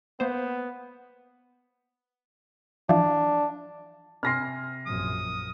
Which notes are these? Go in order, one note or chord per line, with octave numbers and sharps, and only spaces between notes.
A#3 B3 C5
E3 F3 D4
C3 G#5 C6 F6 A#6 C7
A#1 F#2 D#6